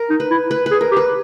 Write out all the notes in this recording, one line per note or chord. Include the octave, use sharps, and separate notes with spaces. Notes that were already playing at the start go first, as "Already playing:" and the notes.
Already playing: A#4
D#4
B4
E4
B4
B4
G#4
A#4
G4
B4